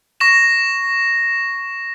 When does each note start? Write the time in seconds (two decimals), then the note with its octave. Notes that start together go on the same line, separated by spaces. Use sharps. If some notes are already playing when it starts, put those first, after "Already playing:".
0.20 C#6 A#6 E7